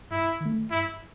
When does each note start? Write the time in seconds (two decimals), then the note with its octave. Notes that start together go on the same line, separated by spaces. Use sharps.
0.11 G2 E4
0.40 D#3
0.45 A3
0.71 G2 E4